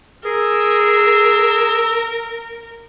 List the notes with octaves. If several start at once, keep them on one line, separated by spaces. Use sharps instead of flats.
G#4 A#4 E6